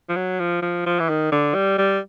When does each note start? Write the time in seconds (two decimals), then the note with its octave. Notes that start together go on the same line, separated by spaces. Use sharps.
0.09 F3
0.16 F#3
0.39 F3
0.62 F3
0.86 F3
0.99 E3
1.09 D#3
1.32 D3
1.55 G3
1.78 G3